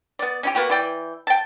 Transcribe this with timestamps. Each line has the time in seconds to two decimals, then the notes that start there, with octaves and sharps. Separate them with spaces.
0.19 B3 D5
0.43 C#4 D#4 G4
0.55 A#3 B3 F#4 G4
0.70 E3 D5 G5
1.27 G5 A5